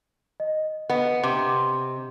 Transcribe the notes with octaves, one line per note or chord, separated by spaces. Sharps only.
D#5
B3 D#5
C3